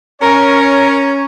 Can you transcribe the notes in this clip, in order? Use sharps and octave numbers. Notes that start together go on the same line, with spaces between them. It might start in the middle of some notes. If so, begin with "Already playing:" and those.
C#4 A#4 C#5